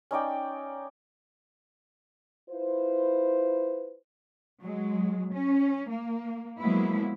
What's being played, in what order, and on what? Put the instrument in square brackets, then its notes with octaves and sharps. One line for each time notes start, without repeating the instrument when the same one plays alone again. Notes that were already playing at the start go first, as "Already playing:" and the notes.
[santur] C#4 D#4 D5 G5
[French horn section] E4 F4 B4 C5
[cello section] F#3 G#3
C#4
A#3
F3 F#3 G#3 A#3 B3 E4